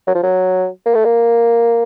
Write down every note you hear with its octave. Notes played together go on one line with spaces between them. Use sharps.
F#3
F3
F#3
A#3
A3
A#3